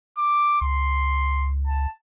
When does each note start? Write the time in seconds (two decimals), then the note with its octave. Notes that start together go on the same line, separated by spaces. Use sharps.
0.17 D6
0.61 C#2 C6
1.67 A5